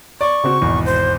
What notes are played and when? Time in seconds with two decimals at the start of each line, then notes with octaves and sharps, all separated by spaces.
0.21 D5 C#6
0.44 C#3 C4 F#4
0.61 G#1 E2 B2
0.85 C5